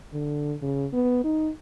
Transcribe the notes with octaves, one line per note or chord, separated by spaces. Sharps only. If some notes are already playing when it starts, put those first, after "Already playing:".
D3
C#3
B3
D#4